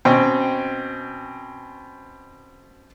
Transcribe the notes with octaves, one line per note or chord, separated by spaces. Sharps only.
B2 C4 C#4 G5